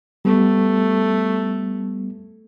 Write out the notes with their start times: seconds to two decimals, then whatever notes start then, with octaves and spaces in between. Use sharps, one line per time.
0.25 G3 A3 B3